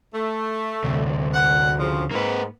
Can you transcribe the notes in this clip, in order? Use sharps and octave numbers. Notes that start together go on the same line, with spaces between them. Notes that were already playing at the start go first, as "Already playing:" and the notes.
A3
D2 C3
F#5
C#3 F3
G#2 A#3 B4